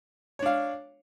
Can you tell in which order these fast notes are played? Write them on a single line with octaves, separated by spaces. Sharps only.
C#5 D4 F5